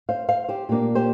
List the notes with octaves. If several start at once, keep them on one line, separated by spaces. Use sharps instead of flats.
C5 F5
C5 F5
G4 C5
A#2 A#3 D4 G4
G4 C5